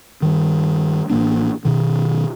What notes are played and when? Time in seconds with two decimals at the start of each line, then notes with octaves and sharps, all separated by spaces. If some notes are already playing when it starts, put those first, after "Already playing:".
0.22 G2 D#3
1.10 A1 F#3 A#3 D4
1.65 B2 D#3